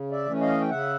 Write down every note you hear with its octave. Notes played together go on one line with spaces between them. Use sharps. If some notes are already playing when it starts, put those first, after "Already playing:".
Already playing: C#3
D5 E5
E3 A3 C#4
D#5 F5
G5
C#3 E5 F#5